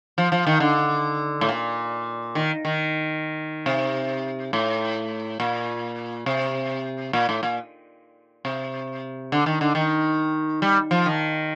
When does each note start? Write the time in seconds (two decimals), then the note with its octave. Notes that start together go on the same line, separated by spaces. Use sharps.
0.18 F3
0.32 F3
0.47 D#3
0.60 D3
1.41 A2
1.49 A#2
2.35 D#3
2.65 D#3
3.66 C3
4.53 A2
5.40 A#2
6.26 C3
7.13 A#2
7.29 A2
7.43 A#2
8.45 C3
9.32 D3
9.46 D#3
9.61 D3
9.75 D#3
10.62 G3
10.91 F3
11.06 D#3